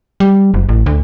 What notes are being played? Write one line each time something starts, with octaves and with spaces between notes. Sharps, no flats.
G3
F#1
A1
D2